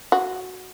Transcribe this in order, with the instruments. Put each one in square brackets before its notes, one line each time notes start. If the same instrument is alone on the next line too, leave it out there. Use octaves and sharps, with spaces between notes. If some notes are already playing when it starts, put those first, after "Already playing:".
[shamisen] F#4